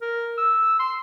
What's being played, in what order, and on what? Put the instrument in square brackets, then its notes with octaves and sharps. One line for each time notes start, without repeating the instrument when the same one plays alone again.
[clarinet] A#4
E6
C6